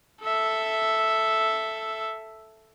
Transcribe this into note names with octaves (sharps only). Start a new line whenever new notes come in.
A4 E5